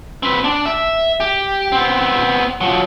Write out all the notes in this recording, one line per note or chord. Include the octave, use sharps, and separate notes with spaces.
C4 B4
D4
E5
G4
B3 C4
F3 F#3